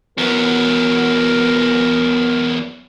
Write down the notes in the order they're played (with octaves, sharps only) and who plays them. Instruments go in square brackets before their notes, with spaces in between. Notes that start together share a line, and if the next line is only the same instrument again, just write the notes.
[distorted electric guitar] E2 F#3 [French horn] B3 [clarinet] A#4